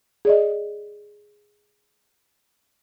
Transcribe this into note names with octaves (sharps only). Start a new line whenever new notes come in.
G#4 D5 D#5